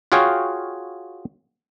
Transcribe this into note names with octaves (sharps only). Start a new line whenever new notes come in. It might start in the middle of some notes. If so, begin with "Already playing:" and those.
F4 F#4 G#4 C#5 F5 G5